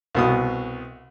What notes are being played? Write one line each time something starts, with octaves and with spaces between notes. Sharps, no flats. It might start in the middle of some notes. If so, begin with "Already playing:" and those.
C2 B2 D#6